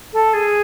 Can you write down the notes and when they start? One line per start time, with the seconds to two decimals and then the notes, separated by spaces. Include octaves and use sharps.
0.13 A4
0.33 G#4